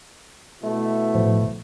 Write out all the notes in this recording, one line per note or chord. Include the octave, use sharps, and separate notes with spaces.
B2 A3 E4
A2 F3